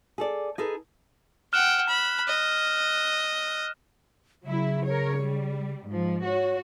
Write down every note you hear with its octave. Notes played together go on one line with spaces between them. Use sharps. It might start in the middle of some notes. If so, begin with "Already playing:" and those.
G#4 A4 D5
D#4 G#4 A4 B4
F#5 G5 F6 F#6 E7
B5
D#5
C#3 F#3 E4
A#4 C#5
G3
G#2 F3
F#4 C#5